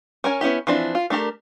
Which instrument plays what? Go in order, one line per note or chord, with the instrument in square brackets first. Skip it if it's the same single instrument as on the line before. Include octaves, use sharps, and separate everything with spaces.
[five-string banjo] C#4 A#4 G#5
B3 C#4 E4 G4
E3 F3 C4 D4 E4
F4
A3 D4 G4 A#4